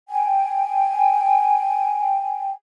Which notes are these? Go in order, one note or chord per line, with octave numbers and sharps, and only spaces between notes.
G5 G#5